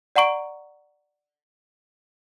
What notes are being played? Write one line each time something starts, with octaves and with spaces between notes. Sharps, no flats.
D5 F#5 A#5 C#6 D7